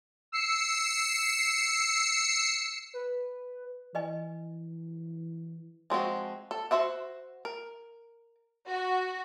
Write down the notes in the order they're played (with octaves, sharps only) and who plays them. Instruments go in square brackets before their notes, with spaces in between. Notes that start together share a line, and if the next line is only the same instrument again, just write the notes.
[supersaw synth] E6 C7 C#7
[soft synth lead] B4
[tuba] E3 [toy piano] B4 D#5 G#5
[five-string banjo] F3 G#3 C4 F#4
A4
F#4 C5 E5 F#5
A#4
[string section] F#4